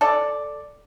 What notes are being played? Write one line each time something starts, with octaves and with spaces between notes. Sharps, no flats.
A4 D5